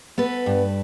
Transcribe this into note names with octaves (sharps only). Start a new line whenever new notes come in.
B3 A4 B4
G2